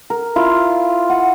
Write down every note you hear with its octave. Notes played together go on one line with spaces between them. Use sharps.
A#4
E4 F4 A#4 F5
F#5